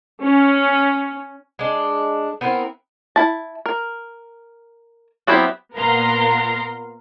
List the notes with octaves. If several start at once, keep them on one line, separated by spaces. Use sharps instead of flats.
C#4
G#3 D4
B3 C4 E4 A#4
E4 A5
A#4
F#3 B3 C4 E4 G4
A#2 B3 A#4 F5 A#5 C6